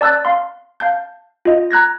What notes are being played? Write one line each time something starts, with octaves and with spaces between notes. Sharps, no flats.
D5 A5 E6 F#6 A6
F5 C6
F5 A5 G6
F4 D#5
A#5 F#6 G#6 A#6